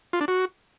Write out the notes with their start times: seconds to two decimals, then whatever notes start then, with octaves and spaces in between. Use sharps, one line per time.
0.13 F4
0.21 D4
0.28 F#4